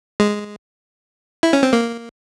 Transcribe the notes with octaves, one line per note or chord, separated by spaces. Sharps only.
G#3
E4
C#4
C4
A#3